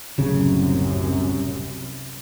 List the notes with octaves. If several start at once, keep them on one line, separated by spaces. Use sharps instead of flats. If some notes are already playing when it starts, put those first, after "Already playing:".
D1 C2 F#2 C#3